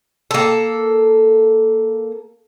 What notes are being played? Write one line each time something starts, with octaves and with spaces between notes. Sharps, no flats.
A#3 A4